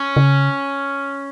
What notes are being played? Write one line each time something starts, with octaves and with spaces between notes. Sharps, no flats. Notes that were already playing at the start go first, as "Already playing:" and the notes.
Already playing: C#4
C#3